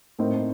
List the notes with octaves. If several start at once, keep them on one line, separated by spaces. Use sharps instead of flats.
A2 A3 C4 D#4 A#4